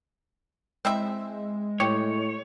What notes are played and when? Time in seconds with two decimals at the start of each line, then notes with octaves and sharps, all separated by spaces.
0.85 G#3 C4 E4 E5
1.80 A2 G4 C#5